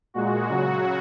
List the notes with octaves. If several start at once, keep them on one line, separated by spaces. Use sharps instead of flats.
A#2 G#3 F#4
C#3 F#3